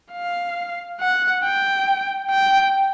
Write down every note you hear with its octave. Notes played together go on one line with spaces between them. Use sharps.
F5
F#5
G5
G5